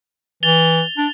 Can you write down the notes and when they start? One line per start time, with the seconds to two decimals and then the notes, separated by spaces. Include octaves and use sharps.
0.43 E3 A6 F7 G7
0.97 D4